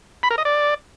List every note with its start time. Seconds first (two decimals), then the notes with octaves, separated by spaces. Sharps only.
0.23 B5
0.31 A#4
0.38 D#5
0.45 D5